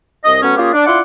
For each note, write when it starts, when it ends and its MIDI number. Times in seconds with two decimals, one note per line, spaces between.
0.25 0.41 36
0.25 0.41 75
0.42 0.57 54
0.42 0.57 57
0.42 0.57 59
0.42 0.57 61
0.57 0.72 58
0.57 0.72 61
0.57 0.72 65
0.57 0.72 67
0.57 0.72 68
0.73 0.83 62
0.86 1.01 62
0.86 1.01 64
0.86 1.01 65
0.86 1.01 78
0.86 1.01 84
0.86 1.01 86